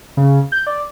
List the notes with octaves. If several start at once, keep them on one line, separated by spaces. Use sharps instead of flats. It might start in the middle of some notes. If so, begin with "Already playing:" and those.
C#3
G6
D5